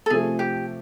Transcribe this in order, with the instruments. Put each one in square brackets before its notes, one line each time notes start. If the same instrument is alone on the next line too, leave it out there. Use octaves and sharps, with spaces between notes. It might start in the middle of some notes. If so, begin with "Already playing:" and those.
[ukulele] A4
[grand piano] C3 F3 A3 [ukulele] G#4
[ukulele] G4